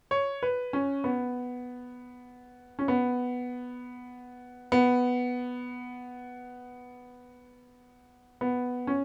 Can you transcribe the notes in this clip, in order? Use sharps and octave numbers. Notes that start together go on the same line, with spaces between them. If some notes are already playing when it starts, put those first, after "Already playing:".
C#5
B4
C#4
B3
C#4
B3
B3
B3
C#4